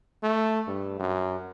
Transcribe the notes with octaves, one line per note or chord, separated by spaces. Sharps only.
A3
G2
F#2